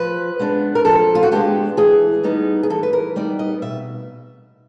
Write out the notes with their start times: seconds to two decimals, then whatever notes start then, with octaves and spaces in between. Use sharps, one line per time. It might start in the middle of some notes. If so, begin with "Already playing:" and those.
Already playing: F3 B4
0.39 G#3 B3 D4
0.75 A#4
0.85 F3 A4
1.15 F4
1.23 F#4
1.32 G#3 B3 D4 G4
1.77 E3 G#4
2.23 G3 B3 D#4
2.63 G#4
2.70 E3 A4
2.83 B4
2.93 A#4
3.16 G3 B3 D#4 D5
3.39 D#5
3.62 B2 E5